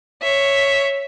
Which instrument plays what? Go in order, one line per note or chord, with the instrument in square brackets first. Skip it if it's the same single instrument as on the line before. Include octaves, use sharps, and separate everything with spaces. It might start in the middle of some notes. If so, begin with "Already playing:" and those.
[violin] C#5 E5